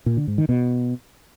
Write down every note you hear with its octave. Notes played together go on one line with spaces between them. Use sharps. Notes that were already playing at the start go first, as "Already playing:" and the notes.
A#2
D3
G#2
D#3
B2